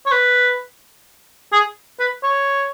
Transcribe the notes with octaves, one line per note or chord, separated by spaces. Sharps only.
C#5
B4
G#4
B4
C#5